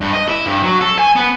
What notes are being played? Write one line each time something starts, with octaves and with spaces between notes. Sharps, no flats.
G2
D#5
E4
G2
F#3
A4
G#5
B3